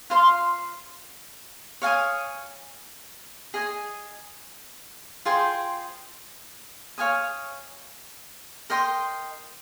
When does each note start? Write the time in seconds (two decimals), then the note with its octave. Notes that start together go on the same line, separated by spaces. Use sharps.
0.10 F4 C5 F5 C6
1.82 C#5 F5 G#5 D#6
3.54 G#4 D#5 G#5 D#6
5.25 F4 G#4 C5 G5
6.98 C#5 F5 G#5 D#6
8.70 A#4 D#5 G5 C6